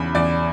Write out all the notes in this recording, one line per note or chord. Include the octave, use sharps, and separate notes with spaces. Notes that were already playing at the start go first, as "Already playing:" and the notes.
Already playing: E2 C#3 B5
E2 D5